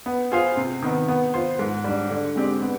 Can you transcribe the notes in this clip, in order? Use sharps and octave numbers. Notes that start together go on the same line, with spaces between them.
B3
F4 G#4 C5 F5
C3
D#3 B3
B3
F4 C5
G#2
G3 D4
D3
G#3 C4 G4 D5
B3